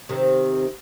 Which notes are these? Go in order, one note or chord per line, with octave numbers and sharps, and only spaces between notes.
C3 D#3